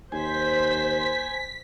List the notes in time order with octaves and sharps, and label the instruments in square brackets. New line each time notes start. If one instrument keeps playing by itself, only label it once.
[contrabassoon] D#2 [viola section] C5 [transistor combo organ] G#5 [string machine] B6